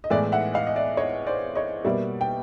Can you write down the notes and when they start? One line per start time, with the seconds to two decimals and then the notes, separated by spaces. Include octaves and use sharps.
0.04 D#5
0.10 A2 E3 G#3 B3 D5 E5
0.32 E5 F#5
0.54 D#5 F5
0.67 D#5
0.76 D5 E5
0.97 C#5 D#5
1.27 C5 D5
1.55 C#5 D#5
1.85 B2 G3 A#3 D5 E5
2.21 G5